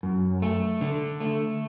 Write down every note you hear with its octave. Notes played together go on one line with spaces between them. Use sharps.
F#2
A3
D3
A3